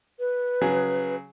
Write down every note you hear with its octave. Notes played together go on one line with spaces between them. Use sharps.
B4
C#3 F#3 G#4